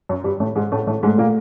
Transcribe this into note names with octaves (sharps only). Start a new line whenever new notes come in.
F#2 F#3
G2 G3
A2 A3
G#2 G#3
A2 A3
A2 A3
G#2 G#3 A3
A#2 A#3